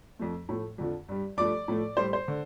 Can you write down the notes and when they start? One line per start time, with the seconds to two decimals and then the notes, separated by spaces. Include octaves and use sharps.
0.19 F2 F3 A3
0.49 A2 F3 A3
0.78 F2 D3 F3
1.09 G2 G3
1.37 G2 F3 A3 D5 D6
1.68 A2 F3 A3
1.97 A2 G3 C5
2.13 C5
2.28 D3